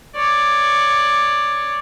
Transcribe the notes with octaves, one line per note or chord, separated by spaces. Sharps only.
C#5 D5